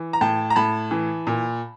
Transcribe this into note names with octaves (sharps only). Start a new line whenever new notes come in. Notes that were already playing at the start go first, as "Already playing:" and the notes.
Already playing: E3
A#5
A2 G5 A5
A#5
A2 A5 B5
E3
A#2